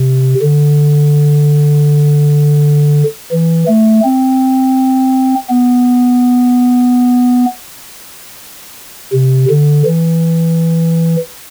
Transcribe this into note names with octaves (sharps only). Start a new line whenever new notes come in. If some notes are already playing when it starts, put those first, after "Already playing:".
Already playing: C3
D3
E3
A3
C4
B3
C3
D3
E3